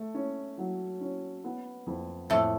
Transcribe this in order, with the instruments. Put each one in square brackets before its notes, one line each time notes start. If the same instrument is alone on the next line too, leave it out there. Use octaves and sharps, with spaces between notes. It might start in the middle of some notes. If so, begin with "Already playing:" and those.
Already playing: [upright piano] A3
C#4
F#3
C#4
B3
F2
[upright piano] F2 [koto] A2 A3